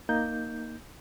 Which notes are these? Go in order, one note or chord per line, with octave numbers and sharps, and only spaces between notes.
A#3 D#4 G6